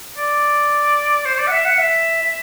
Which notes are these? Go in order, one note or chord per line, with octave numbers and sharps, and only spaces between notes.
D5
C5
D5
F#5
E5
F#5
E5
E5